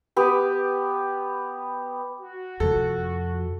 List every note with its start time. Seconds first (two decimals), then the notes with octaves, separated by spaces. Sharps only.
0.16 B3 G4
2.21 F#4
2.60 F2 C3 A4